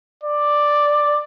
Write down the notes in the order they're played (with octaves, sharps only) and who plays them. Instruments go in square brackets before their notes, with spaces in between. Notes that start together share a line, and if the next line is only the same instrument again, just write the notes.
[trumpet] D5